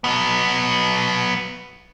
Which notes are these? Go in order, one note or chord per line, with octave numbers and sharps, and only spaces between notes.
F#3 B3